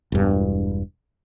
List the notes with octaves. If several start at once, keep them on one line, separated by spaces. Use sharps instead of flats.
E1 G2